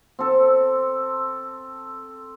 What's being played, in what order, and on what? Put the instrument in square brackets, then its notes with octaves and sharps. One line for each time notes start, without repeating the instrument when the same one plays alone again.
[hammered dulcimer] C4 A4